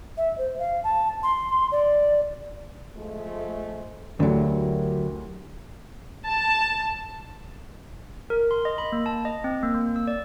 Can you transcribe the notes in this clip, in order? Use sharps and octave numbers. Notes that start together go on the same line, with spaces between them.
E5
C5
F5
A5
C6
D5
F3 G#3 A3
D2 D3 F#3 E4 G4 A#4
A5
A#4
C6
D#5
B5
A#3
A5
D#5
C4
A#3
A#3
E6
D5